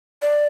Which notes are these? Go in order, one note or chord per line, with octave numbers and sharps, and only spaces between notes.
D5